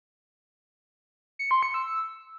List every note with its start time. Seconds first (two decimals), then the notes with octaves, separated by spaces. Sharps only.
1.39 C#7
1.51 C6
1.63 C#7
1.74 E6